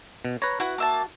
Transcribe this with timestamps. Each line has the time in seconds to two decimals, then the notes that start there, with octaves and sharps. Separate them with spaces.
0.25 B2
0.42 B4 C#5 A#5
0.60 E4 F#4 B4 F#5
0.78 A#3 E5 A5